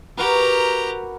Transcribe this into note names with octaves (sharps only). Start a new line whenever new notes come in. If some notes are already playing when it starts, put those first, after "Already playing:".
F#4 G4 A#4 B4 A#5